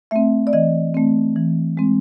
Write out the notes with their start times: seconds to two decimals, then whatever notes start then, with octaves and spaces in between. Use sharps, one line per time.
0.11 A3 C4 E5
0.47 D5
0.53 E3 D#5
0.95 A3 C4
1.36 E3
1.77 G#3 C4